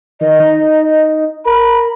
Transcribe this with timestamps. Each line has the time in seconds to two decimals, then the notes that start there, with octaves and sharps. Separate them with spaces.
0.21 D#3 D#5
0.40 D#4
1.45 A#4 B5